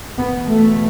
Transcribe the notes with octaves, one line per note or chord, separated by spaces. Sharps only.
E2 B2 B3
A3